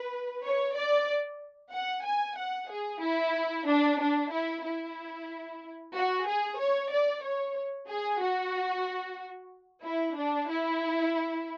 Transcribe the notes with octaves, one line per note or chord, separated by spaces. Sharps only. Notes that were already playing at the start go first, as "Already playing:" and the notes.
Already playing: B4
C#5
D5
F#5
G#5
F#5
G#4
E4
D4
D4
E4
E4
F#4
G#4
C#5
D5
C#5
G#4
F#4
E4
D4
E4